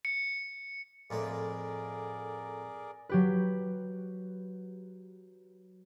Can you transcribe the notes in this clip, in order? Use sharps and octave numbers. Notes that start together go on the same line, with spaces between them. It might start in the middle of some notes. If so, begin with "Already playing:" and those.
C#7
F2 A2 A#3 G#4 A#4 D5
F#3 G4 B4